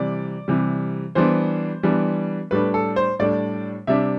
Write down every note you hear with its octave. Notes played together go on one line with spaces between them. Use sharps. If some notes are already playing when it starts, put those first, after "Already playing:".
Already playing: C3 E3 G3 D5
C3 E3 G3
E3 G3 B3 D4 C5
E3 G3 B3 D4
A2 G3 D4 B4
A4
C5
A2 G3 D4 D5
C3 G3 D4 E5